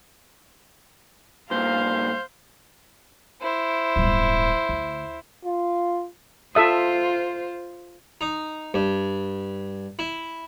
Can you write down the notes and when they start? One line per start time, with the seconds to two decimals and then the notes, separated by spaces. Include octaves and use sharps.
1.51 G2 A#2 C5 F5
3.42 E4 C5
3.96 D1 G1
4.69 D2
5.44 F4
6.55 F4 A4 C5 E5 D#6
8.21 D#4
8.74 G2
9.99 E4